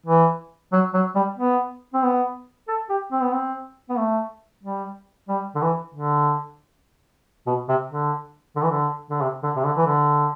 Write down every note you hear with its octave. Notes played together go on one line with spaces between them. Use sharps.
E3
F#3
F#3
G3
B3
C4
B3
A4
G4
C4
B3
C4
B3
A3
G3
G3
D3
E3
D3
B2
C3
D3
D3
E3
D3
D3
C3
D3
C3
D3
E3
D3